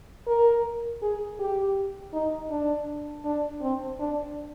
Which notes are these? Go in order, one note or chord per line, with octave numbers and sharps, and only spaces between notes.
A#4
G#4
G4
D#4
D4
D4
C4
D4